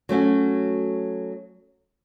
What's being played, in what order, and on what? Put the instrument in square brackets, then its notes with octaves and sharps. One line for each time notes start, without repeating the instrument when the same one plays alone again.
[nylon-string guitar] F#3 A3 C#4 F#4